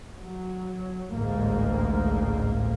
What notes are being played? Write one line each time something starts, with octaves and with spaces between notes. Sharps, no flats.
F#3
A1 D2 G#2 A#3